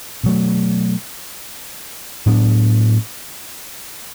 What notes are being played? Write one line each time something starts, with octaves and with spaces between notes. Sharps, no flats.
B2 F#3 A3
A2 F#3 B3 D4